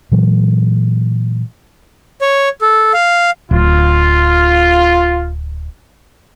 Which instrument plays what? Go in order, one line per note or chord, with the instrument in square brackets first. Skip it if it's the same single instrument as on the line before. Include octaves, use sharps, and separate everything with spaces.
[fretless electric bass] A#2 E3 F#3 G#3
[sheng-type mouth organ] C#5
A4
F5
[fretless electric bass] D1 [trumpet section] F4